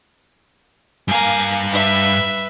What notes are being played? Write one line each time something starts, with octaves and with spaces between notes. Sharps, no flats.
G2 A#3 F5 G#5
B4 E5